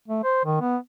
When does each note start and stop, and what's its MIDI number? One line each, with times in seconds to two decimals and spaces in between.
0.08 0.23 57
0.24 0.42 72
0.45 0.59 51
0.61 0.77 59